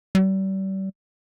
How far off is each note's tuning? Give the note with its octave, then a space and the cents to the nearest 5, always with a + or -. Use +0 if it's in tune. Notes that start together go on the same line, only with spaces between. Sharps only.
G3 -35